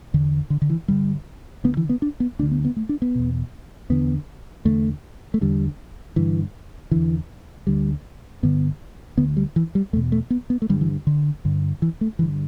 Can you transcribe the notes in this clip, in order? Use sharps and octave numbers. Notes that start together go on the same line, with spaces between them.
E2 D3
D3
D3
E3
G2 D3 G3
D2 D3 B3
E3
B3
D4
B3
D2 D3 D4
B3
B3
A3
D4
B3
E2 B2
E2 D3 B3
E2 D3 A3
A3
E2 D3 G3
G2 D3 E3
E2 D3 E3
D2 D3 G3
G2 D3 B3
D2 D3 B3
G3
E3
G3
E2 B2 A3
A3
B3
B3
A3
G2 D3 G3
E3
D3
G2 D3
E3
A3
G2 D3 E3